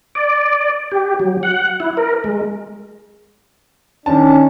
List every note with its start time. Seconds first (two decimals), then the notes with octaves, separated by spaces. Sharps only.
0.15 D5
0.92 G4
1.20 F#3
1.43 F#5
1.80 E4
1.97 A#4
2.24 G#3
4.06 D#3 C#4 D4 A5